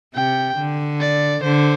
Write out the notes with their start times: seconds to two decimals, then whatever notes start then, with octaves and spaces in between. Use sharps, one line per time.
0.15 C3 G5
0.57 D3
1.01 D5
1.44 D3 C5